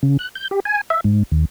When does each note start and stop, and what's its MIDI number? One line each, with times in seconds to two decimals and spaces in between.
0.03 0.17 49
0.19 0.29 90
0.35 0.48 91
0.51 0.60 67
0.65 0.81 80
0.90 1.01 76
1.04 1.23 44
1.32 1.45 39